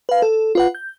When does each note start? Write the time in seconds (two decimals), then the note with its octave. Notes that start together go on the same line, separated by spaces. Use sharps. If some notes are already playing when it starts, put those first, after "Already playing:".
0.09 B4 F5
0.22 A4
0.55 F4 B4 F#5
0.75 G6